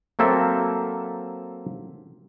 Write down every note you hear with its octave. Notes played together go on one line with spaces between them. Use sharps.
F#3 A#3 C4 A4 E5